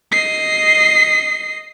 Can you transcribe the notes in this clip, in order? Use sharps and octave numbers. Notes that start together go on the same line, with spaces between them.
D#5 C7